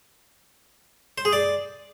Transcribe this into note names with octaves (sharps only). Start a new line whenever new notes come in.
C5
G#4
D5